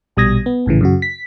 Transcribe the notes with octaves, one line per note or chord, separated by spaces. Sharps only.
A#1 B2 G3 D#6 G#6 A#6
B3
A#1 A2 C#3 E3
F#2 C#3 F#4
B6